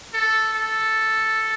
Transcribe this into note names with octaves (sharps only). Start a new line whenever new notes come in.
A4
A4